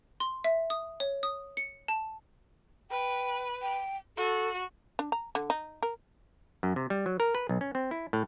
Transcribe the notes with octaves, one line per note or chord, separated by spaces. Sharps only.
C6
E5
D#6
C#5
D#6
C#7
A5
B4 G5
G5
F#4 A4
D4
A#5
D3
D#4
A#4
F#2
C3
G3
F#3
A#4
B4
B1
C#4
C4
E4
A2